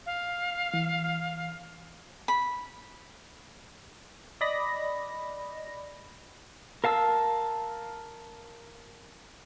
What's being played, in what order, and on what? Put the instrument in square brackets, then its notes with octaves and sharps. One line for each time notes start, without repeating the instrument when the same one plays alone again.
[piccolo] F5
[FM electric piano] E3
[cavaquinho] B5
[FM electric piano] D5 D#5 B5 A#6
[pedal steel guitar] A#4 F5 A5 E6